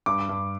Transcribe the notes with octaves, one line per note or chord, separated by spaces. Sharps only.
G2 D6
G2